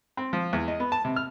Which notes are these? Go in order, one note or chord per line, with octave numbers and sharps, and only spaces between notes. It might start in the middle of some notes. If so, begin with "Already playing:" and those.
C4
F3
E2
D#5
B3
A5
C3
F6